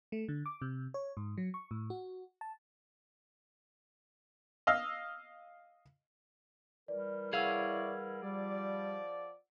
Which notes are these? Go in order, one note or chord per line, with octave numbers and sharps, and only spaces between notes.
A3
D3
D6
C3
C#5
G#2
F#3
C#6
A2
F#4
A5
D#5 F5 E6
E3 G3 A#4 D5
E4 G#4 C#5 D5 F5 F#5 E6 G#6
F3 G3 D5